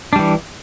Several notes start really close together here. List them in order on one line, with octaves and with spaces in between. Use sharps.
D4 G3 E3